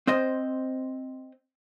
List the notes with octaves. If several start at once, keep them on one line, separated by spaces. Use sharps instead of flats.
C4 C5 D#5